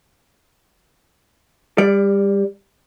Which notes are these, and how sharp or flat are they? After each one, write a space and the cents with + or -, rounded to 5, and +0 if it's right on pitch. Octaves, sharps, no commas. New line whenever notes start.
G3 +25 D5 +0